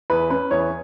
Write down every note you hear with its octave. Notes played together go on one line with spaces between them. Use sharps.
E2 B4
C#4 B4
E2 C#5